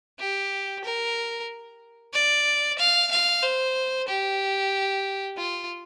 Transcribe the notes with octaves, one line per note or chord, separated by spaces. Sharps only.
G4
A#4
D5
F5
F5
C5
G4
F4